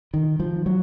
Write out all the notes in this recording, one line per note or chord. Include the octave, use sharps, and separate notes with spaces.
D#3
F3
F#3